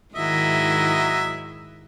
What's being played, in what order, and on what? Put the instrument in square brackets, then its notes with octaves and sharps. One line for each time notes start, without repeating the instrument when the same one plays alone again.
[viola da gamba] G#2 D#3 E4 [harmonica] F#3 D#5 E5